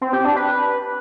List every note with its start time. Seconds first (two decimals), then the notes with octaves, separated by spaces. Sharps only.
0.01 C4
0.13 G4
0.25 D4
0.36 B4